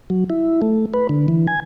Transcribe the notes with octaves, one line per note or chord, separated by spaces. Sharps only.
F#3
E4
A3
B4
D3
E3
G#5